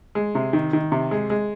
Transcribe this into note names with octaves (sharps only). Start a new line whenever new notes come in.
G#3
C3
D#3
D#3
C3
G#3
G#3